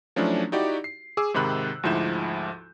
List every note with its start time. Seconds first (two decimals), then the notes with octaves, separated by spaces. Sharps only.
0.16 F3 F#3 A3 C#4 D4 E4
0.52 D#4 E4 F#4 G4 D5
0.84 C7
1.17 G#4 D6 E6
1.34 G#2 C3 D#3 B5 F#6
1.83 D2 G#2 F3 E4 G6 E7